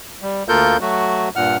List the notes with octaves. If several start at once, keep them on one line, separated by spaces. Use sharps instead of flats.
G3
D2 A#3 F4 A4 A#4 G6
F#3 A3 F#4
G2 A#2 F#5 F6